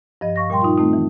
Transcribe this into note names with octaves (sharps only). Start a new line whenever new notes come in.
G2 F3 D#5
F5 C#6 A#6
A#2 G3 G5 C6
D#4 F4
D#3 A3 C4 D#4
E3